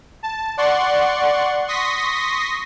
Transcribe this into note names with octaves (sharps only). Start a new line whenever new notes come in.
A5
D5 F#5 C6 C#6
C6 C#6 D#6 A#6 B6